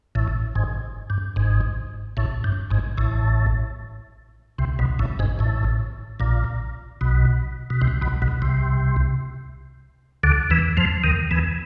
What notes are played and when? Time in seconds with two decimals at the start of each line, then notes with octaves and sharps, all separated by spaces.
0.15 A1 A2
0.55 G#1 G#2
1.10 G2
1.36 G#1 G#2
2.17 A1 A2
2.44 G2
2.71 G#1 G#2
2.98 A1 A2
4.58 C2 C3
4.79 B1 B2
4.99 A1 A2
5.19 G#1 G#2
5.39 A1 A2
6.20 A#1 A#2
7.01 B1 B2
7.70 B2
7.81 C2 C3
8.01 B1 B2
8.22 B1 B2
8.42 C2 C3
10.23 D2 D3
10.50 E2 E3
10.77 F2 F3
11.04 D#2 D#3
11.31 E2 E3